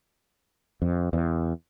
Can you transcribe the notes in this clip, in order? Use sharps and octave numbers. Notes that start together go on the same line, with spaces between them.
F2
E2